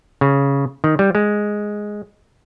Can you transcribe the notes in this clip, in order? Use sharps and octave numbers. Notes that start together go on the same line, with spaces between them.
C#3
D#3
G3
G#3